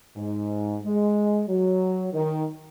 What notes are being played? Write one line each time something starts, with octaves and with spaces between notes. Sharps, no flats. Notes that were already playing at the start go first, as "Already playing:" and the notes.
G#2
G#3
F#3
D#3